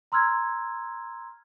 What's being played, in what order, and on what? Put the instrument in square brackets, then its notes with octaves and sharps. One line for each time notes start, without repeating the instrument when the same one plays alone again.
[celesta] A#5 C6 E6 F6 G#6